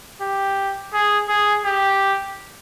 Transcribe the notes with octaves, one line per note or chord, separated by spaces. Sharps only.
G4
G#4
G#4
G4